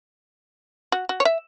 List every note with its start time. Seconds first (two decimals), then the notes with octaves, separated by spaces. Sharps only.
0.92 F#4
1.09 F#4
1.20 C#5
1.25 E5